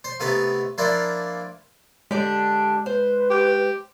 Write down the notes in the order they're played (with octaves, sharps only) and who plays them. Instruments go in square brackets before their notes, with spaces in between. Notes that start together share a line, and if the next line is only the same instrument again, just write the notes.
[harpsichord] C5
C3 A3 B3 D#4 B4
F3 A#3 D4 E4
[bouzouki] D3 D4 G4 [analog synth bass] G#3
[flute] B4 [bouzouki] C5
[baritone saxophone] G4